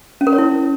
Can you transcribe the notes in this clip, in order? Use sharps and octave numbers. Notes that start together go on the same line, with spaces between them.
C#4
A#4
C#5
E4